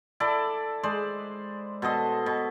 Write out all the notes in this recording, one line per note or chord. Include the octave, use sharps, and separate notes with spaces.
E4 A4 D5
G#3 C5 D5
B2 A4 D#5 C6
B2